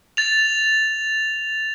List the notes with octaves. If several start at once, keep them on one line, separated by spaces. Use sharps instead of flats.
A6 F7